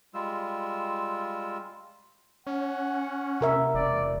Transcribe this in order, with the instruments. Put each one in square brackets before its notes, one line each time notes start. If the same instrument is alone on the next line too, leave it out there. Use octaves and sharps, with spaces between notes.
[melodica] G3 G#3 F4 E6
[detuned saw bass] C#4 [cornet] F#5
[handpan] C3 A#4 E5
[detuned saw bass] E1 [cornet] D5